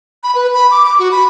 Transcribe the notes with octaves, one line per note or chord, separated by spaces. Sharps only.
B5
B4
B5
D6
D6
F#4
B5